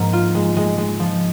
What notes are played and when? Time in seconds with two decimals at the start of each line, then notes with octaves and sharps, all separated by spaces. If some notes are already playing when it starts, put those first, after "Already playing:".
Already playing: G#2 F3 A#3
0.13 F4
0.35 G#3
0.56 G#3
0.78 G#3
1.00 F3